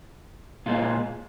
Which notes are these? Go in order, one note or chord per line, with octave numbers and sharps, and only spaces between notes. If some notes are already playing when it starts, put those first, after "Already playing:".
A#2 G#3 F4